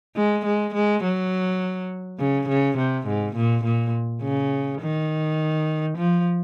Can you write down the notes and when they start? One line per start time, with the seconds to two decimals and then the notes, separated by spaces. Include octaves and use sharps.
0.16 G#3
0.45 G#3
0.74 G#3
1.03 F#3
2.20 C#3
2.49 C#3
2.78 C3
3.07 G#2
3.36 A#2
3.65 A#2
4.23 C#3
4.81 D#3
5.98 F3